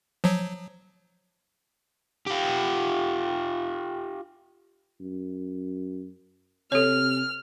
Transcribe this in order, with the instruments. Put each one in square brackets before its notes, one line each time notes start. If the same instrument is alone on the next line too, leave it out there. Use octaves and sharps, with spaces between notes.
[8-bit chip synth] F3 F#3
[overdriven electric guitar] F4 G4
[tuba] F#2
[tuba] C3 [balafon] A4 C#5 [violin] F6